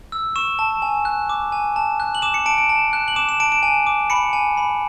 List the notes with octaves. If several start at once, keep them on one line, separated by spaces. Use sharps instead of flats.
E6
C#6 E7
A5
G#5
F#6
D6
G#5
A5
F#6
F#7
D6 E7
C#7
A5 D7
D7
A5
F#6
F#7
D6 E7
E7
A5 D7
D7
G#5
D6
B5 C#7
G#5
B5